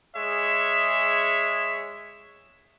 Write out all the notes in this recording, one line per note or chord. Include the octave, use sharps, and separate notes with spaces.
G#3 G#4 C#5 E5